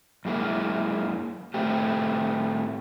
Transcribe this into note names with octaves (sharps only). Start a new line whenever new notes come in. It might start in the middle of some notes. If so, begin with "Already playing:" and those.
F#2 G#3 A#3 E4
A2 A3 C4 G4